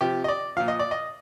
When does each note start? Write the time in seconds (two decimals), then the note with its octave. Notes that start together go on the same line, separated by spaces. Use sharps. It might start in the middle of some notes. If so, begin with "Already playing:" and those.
0.01 C3 F3 G4
0.24 D#5
0.28 D5
0.56 A#2 F3 F5
0.68 D#5
0.79 D5
0.91 D#5